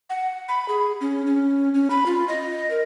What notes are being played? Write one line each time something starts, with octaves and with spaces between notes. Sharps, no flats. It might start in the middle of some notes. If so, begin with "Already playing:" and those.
F#5
B5
G#4
C#4
C#4
C#4
B5
F4
D#5
A#4